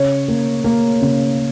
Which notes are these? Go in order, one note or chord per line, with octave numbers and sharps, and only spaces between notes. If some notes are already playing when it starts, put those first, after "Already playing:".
Already playing: C#3 C#5
A#3
A#3
C#3